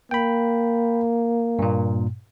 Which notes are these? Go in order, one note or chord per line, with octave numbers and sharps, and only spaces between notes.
A#3 G5 B5
G2 A#2